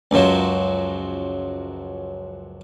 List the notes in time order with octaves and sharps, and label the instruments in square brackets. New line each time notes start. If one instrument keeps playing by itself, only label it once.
[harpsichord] C#2 F#2 F3 F#3